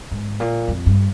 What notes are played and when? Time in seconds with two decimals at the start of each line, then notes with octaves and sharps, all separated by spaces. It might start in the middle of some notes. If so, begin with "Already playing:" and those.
0.11 G#2
0.40 A#2
0.68 F2
0.86 G2